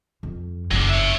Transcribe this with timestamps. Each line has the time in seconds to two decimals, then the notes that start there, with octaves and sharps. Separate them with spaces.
0.23 F2
0.71 F#1 F2 F#3 D4
0.89 C#5 E5